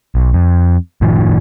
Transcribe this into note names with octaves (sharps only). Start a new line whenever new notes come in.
B1
F2
F#1 A2 D#3 F3